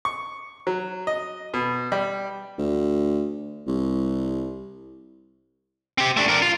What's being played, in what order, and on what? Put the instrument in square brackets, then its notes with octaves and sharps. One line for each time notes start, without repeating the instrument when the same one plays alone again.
[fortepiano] C#6
F#3
D#5
B2
G3
[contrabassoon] D2
C2
[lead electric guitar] C4 G4
A3 D4
D4 A#4
F4